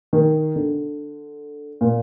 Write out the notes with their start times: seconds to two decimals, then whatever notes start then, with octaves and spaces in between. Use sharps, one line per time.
0.13 D#3
0.56 D3
1.81 A#2